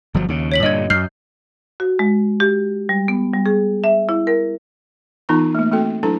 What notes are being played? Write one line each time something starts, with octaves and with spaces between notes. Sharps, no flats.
G1 F3 F#3
D#2 C#3
C#5 B6 F#7
G2 A#2 D3 D#5 G#6
F#2 F6 G6 C7
F#4
G#3
G4
G3
B3
G3
G#4
E5
E4
A#4
E3 B3 D#4 F4 A#5 C#6
A3 A#3
A3 C4 F#4 A4 G5
F#3 D4 E4 A4 A#5